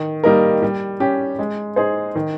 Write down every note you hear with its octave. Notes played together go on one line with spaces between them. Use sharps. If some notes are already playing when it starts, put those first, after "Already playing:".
Already playing: D#3
G3 A#3 D#4 A#4
G3
C#4 G4
G#3
D#4 G#4 C5
D#3